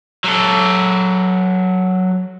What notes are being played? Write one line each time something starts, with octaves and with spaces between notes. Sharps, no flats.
F#3 A4